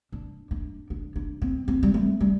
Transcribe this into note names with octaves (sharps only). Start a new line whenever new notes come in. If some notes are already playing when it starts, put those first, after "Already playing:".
D4
D4
D4
D4
C4
C4
G3
A3
G3